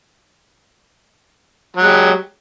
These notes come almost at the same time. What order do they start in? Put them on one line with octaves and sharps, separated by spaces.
F#3 G#3 G4